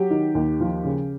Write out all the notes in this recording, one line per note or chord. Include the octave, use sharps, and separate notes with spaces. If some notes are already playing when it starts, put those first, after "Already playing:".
Already playing: F#3 G4
D#3
D#2
F3
C#3